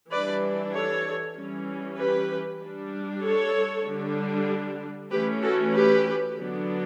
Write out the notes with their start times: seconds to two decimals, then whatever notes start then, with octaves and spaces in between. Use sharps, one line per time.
0.11 E3 G3 D4 B4 D5
0.73 A4 C#5
1.36 E3 G3 C#4
1.98 G4 B4
2.61 G3 D4
3.23 A4 C#5
3.86 D3 G3 D4
5.11 E3 A3 C#4 G4 B4
5.42 F#4 A4
5.74 G4 B4
6.36 D3 F#3 B3 D4